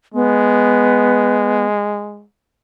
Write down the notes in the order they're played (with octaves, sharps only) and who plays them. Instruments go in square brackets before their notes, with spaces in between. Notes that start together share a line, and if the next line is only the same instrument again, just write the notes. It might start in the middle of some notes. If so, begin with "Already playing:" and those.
[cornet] G#3 [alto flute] B3